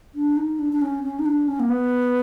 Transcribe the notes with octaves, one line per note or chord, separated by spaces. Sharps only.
D4
D#4
D4
D4
C#4
C#4
D#4
D4
C#4
A#3
B3